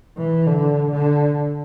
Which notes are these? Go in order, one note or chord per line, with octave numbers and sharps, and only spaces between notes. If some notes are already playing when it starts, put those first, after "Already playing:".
E3
D3
D3